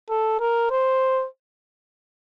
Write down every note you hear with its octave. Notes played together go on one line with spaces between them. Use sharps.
A4
A#4
C5